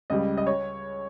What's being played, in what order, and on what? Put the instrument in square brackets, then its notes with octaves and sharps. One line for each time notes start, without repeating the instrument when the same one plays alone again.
[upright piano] C#2 C#3 G3 D#5
D#5
C#5